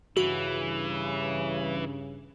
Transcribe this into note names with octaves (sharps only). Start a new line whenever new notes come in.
G2 C#3 E3 F#4